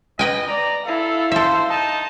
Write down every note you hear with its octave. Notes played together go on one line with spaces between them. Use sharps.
B4 D#5 G5 G#5
D5 A#5
E4 A4 F5
A4 C5 E5
D#4 A5